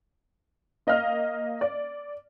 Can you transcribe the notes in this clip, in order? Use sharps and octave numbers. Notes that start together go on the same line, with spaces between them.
A#3 D#5 F5 F6
D5